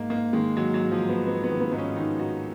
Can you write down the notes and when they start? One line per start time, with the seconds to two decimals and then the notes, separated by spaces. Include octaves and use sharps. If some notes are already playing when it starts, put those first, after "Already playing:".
Already playing: G#2 A#3
0.10 G#2 A#3
0.33 D#3 G#3
0.56 D#3 F#3
0.74 F#3
0.80 G#2
0.91 F3
1.03 G#2
1.09 B3
1.26 G#2 B3
1.44 B3
1.50 D#3
1.60 B3
1.72 G#2 B3
1.78 C#4
1.96 D#3 D#4
2.19 G#2 F#4